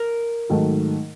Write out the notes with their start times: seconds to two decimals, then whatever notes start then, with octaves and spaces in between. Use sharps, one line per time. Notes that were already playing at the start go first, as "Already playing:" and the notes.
Already playing: A#4
0.49 G#2 D#3 F#3 A3